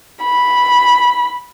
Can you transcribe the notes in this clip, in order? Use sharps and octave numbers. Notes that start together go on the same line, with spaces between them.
B5